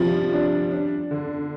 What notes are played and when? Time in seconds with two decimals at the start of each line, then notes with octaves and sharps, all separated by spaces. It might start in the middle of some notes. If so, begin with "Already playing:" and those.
Already playing: C3 F3 G3
0.33 D4
0.72 D4
1.11 D3